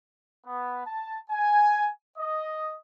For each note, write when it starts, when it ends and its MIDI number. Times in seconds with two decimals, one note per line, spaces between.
0.46 0.85 59
0.86 1.19 81
1.30 1.90 80
2.18 2.75 75